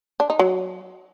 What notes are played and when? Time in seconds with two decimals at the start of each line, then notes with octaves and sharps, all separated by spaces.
0.20 D4
0.30 D#4
0.39 F#3